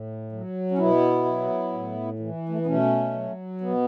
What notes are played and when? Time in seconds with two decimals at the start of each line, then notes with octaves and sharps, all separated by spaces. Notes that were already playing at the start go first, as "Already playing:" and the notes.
Already playing: A2
0.32 F#3
0.71 C#4
0.78 B2 B3 E4
1.25 F#3
1.72 A2
2.19 E3
2.49 A3
2.58 B3
2.66 B2 A3 C#4
3.13 F#3
3.61 B2 B3